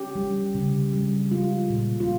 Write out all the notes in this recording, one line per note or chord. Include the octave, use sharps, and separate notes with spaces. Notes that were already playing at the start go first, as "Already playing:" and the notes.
Already playing: C#4 G4
G3
C#3
G3
G#3 F4
A#2
F4